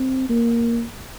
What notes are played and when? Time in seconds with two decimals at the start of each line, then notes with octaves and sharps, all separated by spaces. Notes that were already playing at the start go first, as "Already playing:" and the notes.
Already playing: C4
0.29 A#3